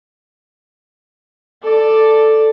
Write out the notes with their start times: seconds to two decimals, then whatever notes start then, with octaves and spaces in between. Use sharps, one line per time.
1.63 A4 D5